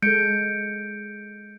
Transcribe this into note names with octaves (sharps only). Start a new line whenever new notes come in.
G#3 A4 G6 C#7 D7